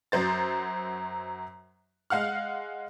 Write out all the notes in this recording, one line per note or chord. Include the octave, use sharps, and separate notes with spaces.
F#2 F#3 C5 A6
G#3 F5 F#5 F6